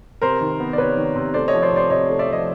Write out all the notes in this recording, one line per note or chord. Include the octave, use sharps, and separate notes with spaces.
C3 A#4 C5
D#3
B3
D5
C3 B4 C#5
D#3
C3
A3 C5 D5
C#5 D#5
F3
C5 D5
C3 C5 D5
C3 C#5 D#5
A3
D5 E5
F3 C#5 D#5